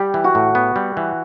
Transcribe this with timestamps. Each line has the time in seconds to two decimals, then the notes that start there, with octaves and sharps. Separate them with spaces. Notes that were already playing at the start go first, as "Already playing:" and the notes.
Already playing: G3 G4
0.14 E3
0.24 F#4
0.35 A2
0.55 B3
0.76 G3
0.97 E3